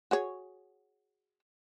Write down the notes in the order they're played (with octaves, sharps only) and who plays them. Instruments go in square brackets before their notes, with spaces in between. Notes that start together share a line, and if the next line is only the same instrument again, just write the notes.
[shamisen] F#4 G#4 C#5